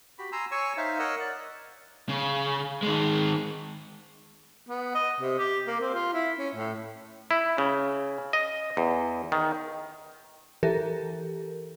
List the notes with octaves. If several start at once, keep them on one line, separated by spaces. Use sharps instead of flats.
F#4 G4 B5
G#5 A#5 C6 E6
C#5 G#5 C#6 E6
D#4 C5 E5 F5
A#4 C#5 D#5 F#5 E6
D5 F#6
C#3
D#3 G#3
B3
D#5
C3
G4
A#3
C4
F4
E4
C#4
A2
E4
C#3
D#5
E2
D#3
E3 G4 A4 A#4